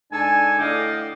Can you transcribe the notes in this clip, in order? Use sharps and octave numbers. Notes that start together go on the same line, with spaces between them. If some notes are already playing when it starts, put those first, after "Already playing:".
G#2 D4 A4 G#5
A2 D3 D5 D#5 F5 G5